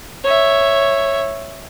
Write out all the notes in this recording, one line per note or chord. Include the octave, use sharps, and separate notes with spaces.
C#5 E5